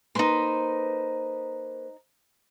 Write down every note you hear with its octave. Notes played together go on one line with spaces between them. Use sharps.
A#3 D#4 B4 C5 C6